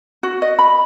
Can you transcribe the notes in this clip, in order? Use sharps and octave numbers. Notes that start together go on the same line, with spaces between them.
F#4
D#5
B5